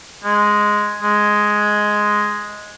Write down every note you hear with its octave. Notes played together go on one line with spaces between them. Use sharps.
G#3
G#3